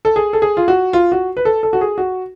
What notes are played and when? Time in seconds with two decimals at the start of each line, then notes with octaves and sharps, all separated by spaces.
0.05 A4
0.16 G#4
0.33 A4
0.42 G#4
0.57 F4
0.68 F#4
0.93 F4
1.12 F#4
1.37 B4
1.45 A4
1.63 A4
1.73 F#4
1.81 G#4
1.98 F#4